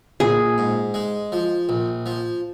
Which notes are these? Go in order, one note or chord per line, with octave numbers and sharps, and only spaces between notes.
A#1 G#4
G#2
G#3
F3
A#1
F3